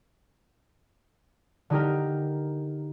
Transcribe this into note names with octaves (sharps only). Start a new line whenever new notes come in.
D3 D#4 G4 A#4